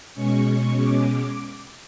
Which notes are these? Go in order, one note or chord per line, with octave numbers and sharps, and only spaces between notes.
B2 G#3 C#4 C#6
D6